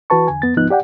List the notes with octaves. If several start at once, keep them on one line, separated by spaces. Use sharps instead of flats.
E3 F#4 B4 A5 C#6
E2 D3 G#5
F2 B3 A6
D2 G#2 F3 B3 D#4 F#6
G4 D5 F#5 G5